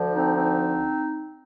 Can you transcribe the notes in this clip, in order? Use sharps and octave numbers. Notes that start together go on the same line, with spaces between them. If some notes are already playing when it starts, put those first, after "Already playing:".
Already playing: D2 D3 F3
C4 D#4
C4 D#4